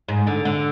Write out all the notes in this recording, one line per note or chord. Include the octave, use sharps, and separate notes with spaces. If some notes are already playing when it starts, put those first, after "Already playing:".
G#2
D3
D3